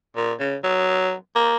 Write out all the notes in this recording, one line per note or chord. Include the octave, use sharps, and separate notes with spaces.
A#2
C#3
F#3
A#3